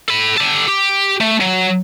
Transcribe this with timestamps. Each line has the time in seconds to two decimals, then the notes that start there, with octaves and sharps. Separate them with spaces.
0.09 A4 B5
0.38 G4 A4
0.68 G4
1.21 A3
1.41 F#3